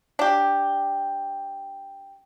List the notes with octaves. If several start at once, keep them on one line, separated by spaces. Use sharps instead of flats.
D4 G4